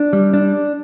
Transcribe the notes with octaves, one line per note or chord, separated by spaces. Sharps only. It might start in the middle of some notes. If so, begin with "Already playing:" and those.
Already playing: D4
G3
D4